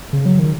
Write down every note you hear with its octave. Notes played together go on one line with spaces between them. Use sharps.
C#3
F#3
D#3